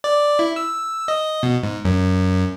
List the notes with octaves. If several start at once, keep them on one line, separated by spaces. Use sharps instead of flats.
D5
E4
E6
D#5
B2
G#2
F#2